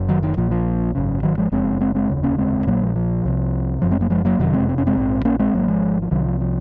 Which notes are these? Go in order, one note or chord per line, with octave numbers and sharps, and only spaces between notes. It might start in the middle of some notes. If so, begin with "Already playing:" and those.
Already playing: F#1 F#2
D#3 F#3
D#3
A#1 A#2 F3
F3
G#1 F#2 C#3
D#3 F#3
F3 G#3
F#1 F2 C#3 G#3 C4
G#3 C4
G#3 C4
F1 D#2 C#3
A#3 C#4
G#3 C4
A#1 A#2 F#3 A#3
F3 G#3
F3
C2 C3
F#1 F#2 C#3 F3
G#3 C4
F#3 A#3
F3 G#3
F#3 A#3
F#1 F2 C3 D#3 F#3
G#3 C4
C4
C#4
G#3 C4
A#1 G#2
A#3 C#4
G#3 C4
G#1 G#2 F#3 A#3
F3 G#3
F3
C2 C3 D#3 F#3
F3
F3